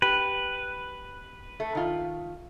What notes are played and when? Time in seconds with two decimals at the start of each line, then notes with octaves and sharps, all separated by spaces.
0.02 G4 B4
1.60 A3
1.75 D#3 F4